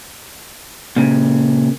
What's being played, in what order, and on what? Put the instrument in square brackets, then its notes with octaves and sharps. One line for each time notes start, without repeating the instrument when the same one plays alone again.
[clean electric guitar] A#2 C#3